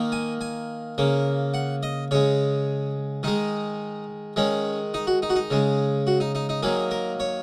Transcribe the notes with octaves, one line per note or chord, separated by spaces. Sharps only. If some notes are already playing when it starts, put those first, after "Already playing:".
Already playing: D#3 A#3
G#5
G#5
C#3 A#3
F#5
D#5
C#3 G#3 C#5
D#3 G#3 D#4
D#3 G#3 C#4
D#4
F#4
D#4
F#4
D#4
C#3 G#3
F#4
D#4
D#4
D#4
D#3 F#3 A#3 G#4
A#4
C#5